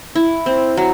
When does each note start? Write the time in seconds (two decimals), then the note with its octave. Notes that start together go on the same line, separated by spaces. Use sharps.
0.15 E4
0.46 C4
0.77 F#3